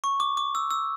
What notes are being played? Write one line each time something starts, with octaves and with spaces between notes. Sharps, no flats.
C#6
D6
D6
E6
E6